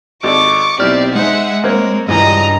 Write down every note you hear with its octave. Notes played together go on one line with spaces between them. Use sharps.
G#1 A4 D5 C#6 D6
B1 C4 E4 G4 D5 F6
G#3 D#4 C5 E5 F#5
A#3 C4 A#4 C#5
C#2 G2 E3 G3 D#5 A#5